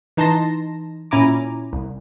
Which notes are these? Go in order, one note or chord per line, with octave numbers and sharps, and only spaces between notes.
E3 D#4 A5 C6 A#6
A#2 C#4 E4 G#5 A#5 D6
C2